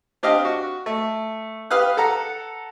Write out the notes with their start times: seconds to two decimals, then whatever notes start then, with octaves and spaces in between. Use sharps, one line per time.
0.23 C4 D4 G4 D#5 F5
0.45 F#4
0.86 A3
1.71 G4 B4 F5 D#6 F#6
1.97 A4 F#5 A#5